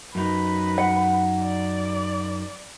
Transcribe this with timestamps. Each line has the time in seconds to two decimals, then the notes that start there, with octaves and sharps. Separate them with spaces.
0.15 F#2 D#4 B4
0.78 F#5
1.40 D5